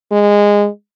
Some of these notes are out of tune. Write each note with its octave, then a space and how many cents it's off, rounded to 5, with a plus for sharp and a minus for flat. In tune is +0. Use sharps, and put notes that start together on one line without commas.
G#3 -15